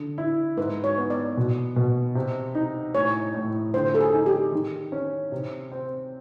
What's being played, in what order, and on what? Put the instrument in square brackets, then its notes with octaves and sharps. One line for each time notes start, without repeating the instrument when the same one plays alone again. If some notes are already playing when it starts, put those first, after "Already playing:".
Already playing: [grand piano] D3
E4
[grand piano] G#2 [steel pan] B4
[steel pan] C#5
[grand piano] B3
[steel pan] D5
[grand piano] B2
B2
C3
D#4
[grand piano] A2 [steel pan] C#5
[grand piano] A2
[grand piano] D3 [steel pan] C5
[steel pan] A4
G#4
[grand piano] D#4
[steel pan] G4
[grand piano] D#3
C#4
C3
C4